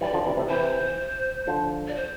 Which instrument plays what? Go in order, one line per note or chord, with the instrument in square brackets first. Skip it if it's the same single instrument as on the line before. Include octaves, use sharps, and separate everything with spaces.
[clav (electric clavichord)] E3 G3 [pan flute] D5
[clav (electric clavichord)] D3 F3
C3 E3
A2 C3
[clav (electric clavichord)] C3 E3 [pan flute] C5
[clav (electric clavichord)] D3 F3
[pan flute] D5
C5